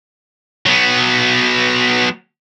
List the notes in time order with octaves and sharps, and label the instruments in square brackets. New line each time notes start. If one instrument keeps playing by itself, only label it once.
[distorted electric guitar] F#3 B3